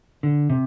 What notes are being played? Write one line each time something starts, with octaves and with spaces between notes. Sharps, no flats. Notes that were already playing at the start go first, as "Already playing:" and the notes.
D3
C3